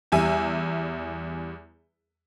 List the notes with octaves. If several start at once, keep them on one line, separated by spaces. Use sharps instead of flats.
E2 G3 E5 G#5